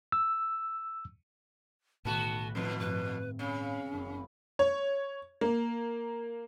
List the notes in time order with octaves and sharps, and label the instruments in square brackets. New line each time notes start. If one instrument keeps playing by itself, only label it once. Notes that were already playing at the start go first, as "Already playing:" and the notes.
[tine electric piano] E6
[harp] B1 D#3 [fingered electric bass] A2 [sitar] B3 F#4 [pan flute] A5
[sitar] F2 B2 [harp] C4 E4 [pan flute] B4
[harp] G2 [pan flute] B4
[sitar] C#3 [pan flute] C#4
[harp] F#1
[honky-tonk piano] C#5
A#3